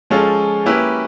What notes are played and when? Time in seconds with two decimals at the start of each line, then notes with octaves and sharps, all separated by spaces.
0.10 F3 G#3 C#4 F4 A4
0.66 A#3 C#4 E4 G4 B4